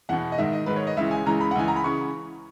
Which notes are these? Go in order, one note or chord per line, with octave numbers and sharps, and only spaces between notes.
E2 B2 F#5
D#5
G#2 D#3 E5
D#5
G#2 D#3 B4
C#5
D#5
C#2 C#3 E3 E5
G#5
C#2 C#3 E3 A#5
B5
F#5
C#2 C#3 E3 G#5
A#5
B5
C#3 E3 C#6